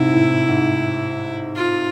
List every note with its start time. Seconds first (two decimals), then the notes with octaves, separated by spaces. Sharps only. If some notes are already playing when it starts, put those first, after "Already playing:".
Already playing: G#2 C3 E4
0.12 A2
0.48 G#2
1.55 F4